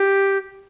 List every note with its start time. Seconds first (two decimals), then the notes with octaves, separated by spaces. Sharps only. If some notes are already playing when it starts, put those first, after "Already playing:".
Already playing: G4